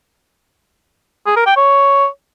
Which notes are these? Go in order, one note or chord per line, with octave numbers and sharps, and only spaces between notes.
G#4
A#4
G5
C#5